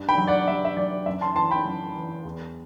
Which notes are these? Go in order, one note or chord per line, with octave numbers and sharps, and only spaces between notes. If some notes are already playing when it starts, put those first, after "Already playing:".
Already playing: G2
G5 B5
F#3
D5 F#5
G2 E5
E5
F#3 D5
F#2 E5
A5 C6
E3 A5 C6
G5 B5
F#2
E3
E2